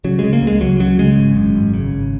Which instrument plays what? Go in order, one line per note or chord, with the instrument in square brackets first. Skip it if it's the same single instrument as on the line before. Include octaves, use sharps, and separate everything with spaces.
[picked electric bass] C#3 F#3
C#3 G#3
A#3
C#2
G#3
C#2 F#3
C#3 F#3
C#3 G#3
G#1
F#2
G#1
C#3
G#1